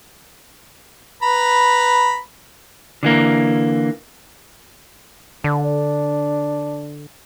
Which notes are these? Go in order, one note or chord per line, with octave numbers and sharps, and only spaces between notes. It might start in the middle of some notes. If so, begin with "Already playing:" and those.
B4 A#5 B5
D3 E3 A#3
D3 D4